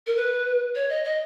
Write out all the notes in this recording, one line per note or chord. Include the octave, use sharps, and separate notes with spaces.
A#4
B4
C#5
D#5
D#5